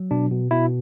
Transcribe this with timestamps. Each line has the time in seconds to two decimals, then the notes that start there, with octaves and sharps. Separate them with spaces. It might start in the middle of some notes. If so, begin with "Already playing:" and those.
Already playing: F#3
0.11 B2 D4
0.31 B2
0.51 B2 E4